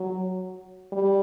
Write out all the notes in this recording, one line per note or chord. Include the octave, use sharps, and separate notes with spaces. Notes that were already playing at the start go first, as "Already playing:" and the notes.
Already playing: F#3
G3